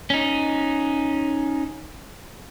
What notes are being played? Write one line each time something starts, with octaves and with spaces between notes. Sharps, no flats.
C#4 D#4